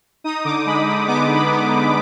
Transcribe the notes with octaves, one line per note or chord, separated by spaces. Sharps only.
D#4 D#6
D3 D6
G#3 B5
D3 B5
B3 D6
G#3
B5
B3
D3